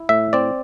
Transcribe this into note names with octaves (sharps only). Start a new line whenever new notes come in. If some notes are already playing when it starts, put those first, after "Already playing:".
Already playing: E4
A2 E5
C4 D5